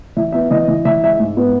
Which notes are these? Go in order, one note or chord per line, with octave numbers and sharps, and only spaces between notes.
E3 E5
B3 E5
E3 D#5
E3
E3 E5
G#3 E5
G#2
B3